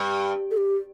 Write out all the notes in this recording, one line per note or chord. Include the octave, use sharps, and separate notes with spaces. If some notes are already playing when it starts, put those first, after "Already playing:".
Already playing: G2
A4
G4